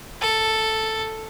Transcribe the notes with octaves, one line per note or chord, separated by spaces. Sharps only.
A4